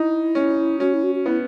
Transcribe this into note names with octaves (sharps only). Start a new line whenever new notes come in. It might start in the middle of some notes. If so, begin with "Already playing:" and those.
Already playing: D#4 E4
C#4
C#4 F#4
E4
F#4
F#4
B3 E4